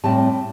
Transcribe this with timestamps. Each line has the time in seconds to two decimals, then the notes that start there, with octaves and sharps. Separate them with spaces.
0.04 A2 G3 C4 A5